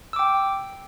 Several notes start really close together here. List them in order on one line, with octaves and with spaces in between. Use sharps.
E6 D6 G5